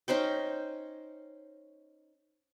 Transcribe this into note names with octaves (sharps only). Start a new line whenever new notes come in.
C#4 D#4 C5 G5